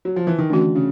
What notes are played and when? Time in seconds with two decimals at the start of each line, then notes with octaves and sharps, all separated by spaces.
0.05 F#3
0.16 F3
0.27 E3
0.38 D#3
0.50 D3 E3 A3 C#4 F#4
0.75 C#3